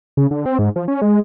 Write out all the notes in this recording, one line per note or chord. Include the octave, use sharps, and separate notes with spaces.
C#3
D3
C4
G#2
F3
C#4
G#3